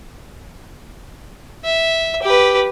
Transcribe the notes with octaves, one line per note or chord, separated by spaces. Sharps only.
E5
G4 B4